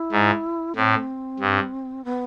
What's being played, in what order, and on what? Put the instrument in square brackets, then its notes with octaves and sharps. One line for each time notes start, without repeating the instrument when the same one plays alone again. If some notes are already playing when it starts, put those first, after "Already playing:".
Already playing: [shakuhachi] E4
[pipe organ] G#2
[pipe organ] A2 [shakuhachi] C4
[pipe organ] G2
[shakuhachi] B3